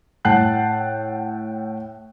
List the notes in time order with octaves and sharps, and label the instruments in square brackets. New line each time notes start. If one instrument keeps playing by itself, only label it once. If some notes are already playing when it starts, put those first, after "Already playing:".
[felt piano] A2 F#5 G5 A5 F#6 C7